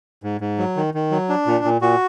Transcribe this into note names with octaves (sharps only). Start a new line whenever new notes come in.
G#2
G#2
F#3
D#3
D#3
F#3
D4
A#2
A#2
A#2 F#4